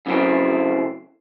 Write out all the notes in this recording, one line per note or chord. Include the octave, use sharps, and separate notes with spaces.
F#2 C#3 E3 F#3 A3 C4